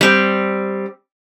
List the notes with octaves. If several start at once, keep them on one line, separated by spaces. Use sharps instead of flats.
G3 C4